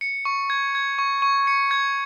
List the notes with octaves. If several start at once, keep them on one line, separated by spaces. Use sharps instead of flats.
C#7
C#6
G#6
G#6
C#6
C#6
C#7
G#6